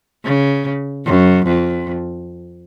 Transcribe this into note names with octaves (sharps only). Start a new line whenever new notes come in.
C#3
F#2
F2